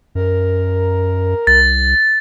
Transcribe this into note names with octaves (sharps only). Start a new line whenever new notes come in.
F#2 A#4
C2 A6